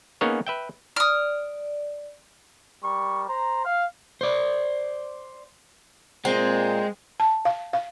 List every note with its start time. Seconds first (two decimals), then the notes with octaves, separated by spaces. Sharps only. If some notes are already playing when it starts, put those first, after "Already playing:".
0.21 A#3 B3 C#4 D#4 G#4 C#5
0.47 B4 E5 G5
0.96 D5 D#6 F6
2.84 G3 A#4 C#6
3.29 C5 A#5
3.64 F5
4.21 C5 D5
6.25 A#2 G#3 C4
7.20 A5
7.45 F5
7.73 F5